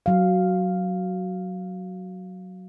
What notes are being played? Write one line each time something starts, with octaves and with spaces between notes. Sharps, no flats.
F#3 F5